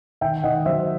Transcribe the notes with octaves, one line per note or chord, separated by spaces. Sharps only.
D#3 E5 G5
D#3 D#5 F#5
F#3 C5 E5